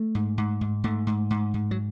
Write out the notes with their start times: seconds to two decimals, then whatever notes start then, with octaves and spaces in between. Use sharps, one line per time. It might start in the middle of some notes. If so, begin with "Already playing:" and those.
Already playing: A3
0.15 G#2
0.38 G#2
0.61 G#2
0.84 G#2 A3
1.07 G#2
1.31 G#2
1.54 G#2
1.71 F#3